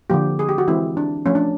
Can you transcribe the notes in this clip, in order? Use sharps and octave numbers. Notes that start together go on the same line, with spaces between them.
D3 F3 A#3 G4
G#4
G4
F#4
E3 G#3 C4 E4
D4
F3 A3 C#4
D4